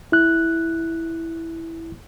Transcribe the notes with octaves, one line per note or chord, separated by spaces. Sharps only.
E4 F#6